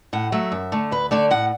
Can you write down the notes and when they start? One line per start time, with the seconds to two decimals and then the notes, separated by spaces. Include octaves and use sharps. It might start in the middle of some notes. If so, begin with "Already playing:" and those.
0.13 A2 F#5
0.32 F#3 A3 E5
0.52 F#2
0.72 D3 A3
0.91 D2 B4
1.11 D3 A3 D5
1.30 A2 F#5